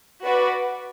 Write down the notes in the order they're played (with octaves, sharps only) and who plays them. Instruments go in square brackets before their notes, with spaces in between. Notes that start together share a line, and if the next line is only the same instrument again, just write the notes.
[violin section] F#4 B4 D5